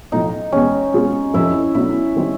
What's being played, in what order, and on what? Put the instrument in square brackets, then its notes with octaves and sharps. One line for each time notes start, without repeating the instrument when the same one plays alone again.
[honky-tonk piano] B1 A2 F3 [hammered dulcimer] D#4
[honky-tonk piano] E2 B2 G#3 B3 [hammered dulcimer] C#4
[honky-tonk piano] B2 G#3 C4 F4 G#4
[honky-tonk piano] F1 F2 C3 F3 [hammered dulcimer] E4
[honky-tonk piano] B2 F#3 A3 D4 [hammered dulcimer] E4
[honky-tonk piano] D#3 G3 C4 D#4